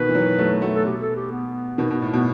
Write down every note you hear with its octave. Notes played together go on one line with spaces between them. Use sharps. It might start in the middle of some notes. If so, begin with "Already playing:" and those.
Already playing: B2 D#3 B4
E3
D#3 F#3
F#3 A3
F#3 A3
A4
B2 G4
A4
G4
B3
B2 D#3
B2
A2
B2 B3